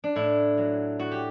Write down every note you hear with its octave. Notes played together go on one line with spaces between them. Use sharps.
D4
A2 E4
F#3
A2 F#4
G4